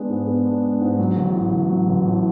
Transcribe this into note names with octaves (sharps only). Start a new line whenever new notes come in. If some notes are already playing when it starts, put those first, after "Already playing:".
Already playing: G#3 B3 D4
G#2
B3
D4
G#3
G#2
F#3
A1
A2
A1
F#3
A1
A2